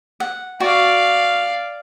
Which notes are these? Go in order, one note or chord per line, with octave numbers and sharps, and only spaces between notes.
F#5
F#4 D5 F5